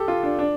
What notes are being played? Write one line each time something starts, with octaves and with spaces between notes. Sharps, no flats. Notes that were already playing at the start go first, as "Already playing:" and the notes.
Already playing: G4 A4
F4
D4
D4